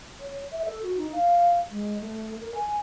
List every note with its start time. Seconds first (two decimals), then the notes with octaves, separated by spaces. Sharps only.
0.20 C#5
0.52 E5
0.65 A4
0.83 F#4
0.97 D#4
1.12 F5
1.70 G#3
2.00 A3
2.40 A#4
2.54 G#5